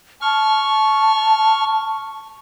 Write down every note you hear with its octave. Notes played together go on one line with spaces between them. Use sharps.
A5 C#6 F6